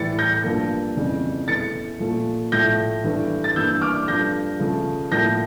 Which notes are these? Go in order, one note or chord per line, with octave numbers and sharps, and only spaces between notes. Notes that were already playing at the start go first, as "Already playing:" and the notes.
Already playing: A2 E3 G3 A6 C#7
G6 A#6
G2 F3 A#3
F2 C#3 E3 G3
E2 E3 A3 A6 C#7
A#2 F3 A3
A2 F3 A3 G6 A#6
G2 E3 A3
A6
G2 E3 A#3 E6 G6
D6 F6
G2 F3 A3 G6 A#6
C#3 F3 A3
A2 F3 A#3 G6 A#6